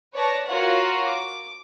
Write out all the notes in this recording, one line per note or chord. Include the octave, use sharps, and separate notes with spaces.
B4 C#5 D5 A5 A#6
F4 F#4 A#4 C#5 F#5
D6